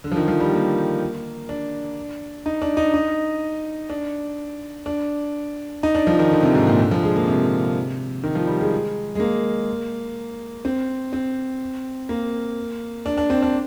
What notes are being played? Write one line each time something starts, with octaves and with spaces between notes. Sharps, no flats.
D3
F3
D#3
F3
G3
A#3
D4
D#4
D4
D#4
D#4
D4
D4
D#4
D4
F3
D#3
D3
C3
G#2
A#2
D3
F3
G#3
A#3
C3
D#3
F3
G3
G#3
G#3
A#3
C4
C4
A#3
D4
D4
C4
D4